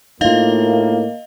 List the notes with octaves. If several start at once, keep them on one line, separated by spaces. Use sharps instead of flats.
A2 A#3 D#4 F4 D#5 F5